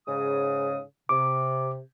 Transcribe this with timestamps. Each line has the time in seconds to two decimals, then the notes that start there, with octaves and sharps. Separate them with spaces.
0.07 G#2 C#3 D#6
1.09 C3 D6